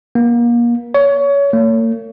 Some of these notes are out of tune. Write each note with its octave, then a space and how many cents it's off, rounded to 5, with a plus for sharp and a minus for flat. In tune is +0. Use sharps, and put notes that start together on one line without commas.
A#3 +30
C#5 +25
A#3 -45